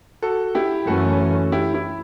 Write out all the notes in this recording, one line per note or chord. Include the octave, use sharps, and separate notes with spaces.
F#4 A4
E4 G4
F#2 E3 A3 C#4 F#4 A4
E4 G4
E4